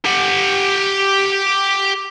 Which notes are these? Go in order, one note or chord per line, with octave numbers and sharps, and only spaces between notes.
G4 F#5